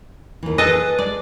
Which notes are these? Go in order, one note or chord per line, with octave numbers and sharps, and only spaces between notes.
D#2 E3
G#4 A4 B4 D#5
G#3 D5